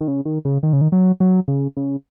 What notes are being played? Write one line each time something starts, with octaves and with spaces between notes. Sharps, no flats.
D#3
C#3
D#3
C#3
D#3
C#3
D#3
F#3
F#3
C#3
C#3